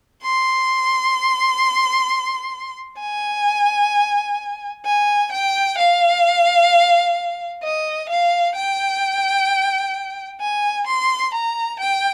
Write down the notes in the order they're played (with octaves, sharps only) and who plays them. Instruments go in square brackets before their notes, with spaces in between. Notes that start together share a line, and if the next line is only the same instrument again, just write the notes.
[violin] C6
G#5
G#5
G5
F5
D#5
F5
G5
G#5
C6
A#5
G5